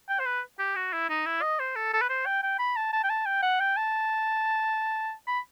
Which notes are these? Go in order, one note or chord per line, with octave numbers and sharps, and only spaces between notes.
G5
C5
B4
G4
F#4
E4
D#4
E4
D#5
C5
A4
A4
B4
C5
G5
G5
B5
A5
A5
G5
A5
G5
F#5
G5
A5
B5